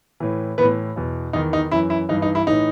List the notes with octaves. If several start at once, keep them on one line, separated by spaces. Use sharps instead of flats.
A2 E3
A2 E3 B3 B4
E2 B2
E2 D#3 D#4
D#4
F#2 E3 E4
E4
G2 E3 D#4
D#4
E4
A2 E3 D#4